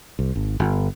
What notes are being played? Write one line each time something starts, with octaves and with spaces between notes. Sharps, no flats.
C2
G#1
G1